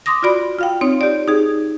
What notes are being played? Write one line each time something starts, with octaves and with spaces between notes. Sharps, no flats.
C6 D6 D#6 A#6
F4 F#4 D5 B5
F4 F5 G5
C4 D#4 C#5
G4 D5
D#4 G#4